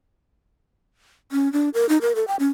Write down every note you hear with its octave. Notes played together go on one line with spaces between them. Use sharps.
C#4
D4
A#4
D#4
A#4
A4
G5
C#4